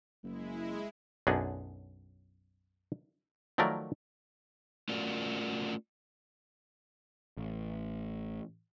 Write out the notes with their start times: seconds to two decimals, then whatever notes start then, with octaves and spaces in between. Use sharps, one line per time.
0.24 F#1 G#3 E4
1.27 B1 F#2 D4 G#4 F#5
3.58 D#3 F3 F#3 A3 A#4 D5
4.89 A3 C#4 F4 F#4 A#4 D5
7.37 A1